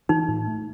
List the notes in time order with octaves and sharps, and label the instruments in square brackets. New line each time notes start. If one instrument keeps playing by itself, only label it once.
[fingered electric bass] E3 [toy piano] D#4
[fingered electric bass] A2
A3